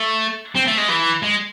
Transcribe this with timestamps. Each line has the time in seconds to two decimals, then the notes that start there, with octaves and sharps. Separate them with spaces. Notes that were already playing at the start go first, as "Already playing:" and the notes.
Already playing: A3
0.56 C4
0.67 A3
0.78 G#3
0.89 E3
1.23 G#3